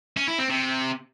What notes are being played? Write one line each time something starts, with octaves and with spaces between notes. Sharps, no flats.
C#4
E4
C4
C3